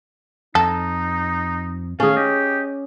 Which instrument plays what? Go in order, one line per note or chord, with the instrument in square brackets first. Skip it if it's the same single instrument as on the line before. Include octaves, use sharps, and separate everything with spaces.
[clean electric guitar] F2 [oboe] D#4 [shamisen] A4
[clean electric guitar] D#3 A3 [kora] C#4 G#4 [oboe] F5
[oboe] G4 [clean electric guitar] D#5